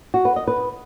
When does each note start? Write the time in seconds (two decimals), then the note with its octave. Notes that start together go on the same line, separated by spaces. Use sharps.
0.14 F#4
0.25 B4
0.36 D#5
0.47 B4